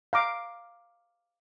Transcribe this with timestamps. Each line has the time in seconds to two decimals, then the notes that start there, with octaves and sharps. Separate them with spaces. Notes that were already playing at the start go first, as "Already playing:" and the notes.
0.13 F5 A#5 D6